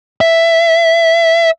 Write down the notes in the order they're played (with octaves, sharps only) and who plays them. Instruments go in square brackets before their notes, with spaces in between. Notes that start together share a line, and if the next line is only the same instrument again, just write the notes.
[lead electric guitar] E5